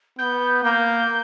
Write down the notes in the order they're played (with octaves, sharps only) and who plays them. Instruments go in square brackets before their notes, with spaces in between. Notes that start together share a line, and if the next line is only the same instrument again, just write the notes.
[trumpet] B3 [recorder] G6
[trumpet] A#3 [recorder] G6